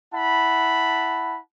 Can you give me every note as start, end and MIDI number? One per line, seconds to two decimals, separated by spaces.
0.14 1.38 64
0.14 1.38 78
0.14 1.38 81
0.14 1.38 83